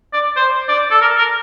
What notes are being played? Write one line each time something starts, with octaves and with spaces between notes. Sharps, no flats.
D5
C5
D5
A4
A#4
A#4